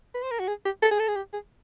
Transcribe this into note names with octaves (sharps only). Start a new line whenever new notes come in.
B4
C5
A#4
F#4
G#4
G4
A4
G#4
A4
G#4
G4
G#4